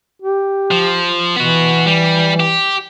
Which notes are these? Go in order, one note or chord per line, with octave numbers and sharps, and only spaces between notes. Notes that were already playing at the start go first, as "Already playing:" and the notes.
G4
F3
E3 B3 F#4
G3
G4